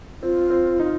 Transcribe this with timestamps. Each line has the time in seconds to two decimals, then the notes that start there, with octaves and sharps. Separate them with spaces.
0.22 C4 F4
0.50 C4
0.80 D#4